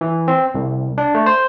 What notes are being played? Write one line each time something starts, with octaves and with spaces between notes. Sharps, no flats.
E3
C4
C2
D4
A3
C5